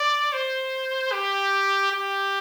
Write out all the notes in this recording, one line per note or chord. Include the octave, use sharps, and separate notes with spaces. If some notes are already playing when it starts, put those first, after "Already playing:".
Already playing: D5
C5
G4
G4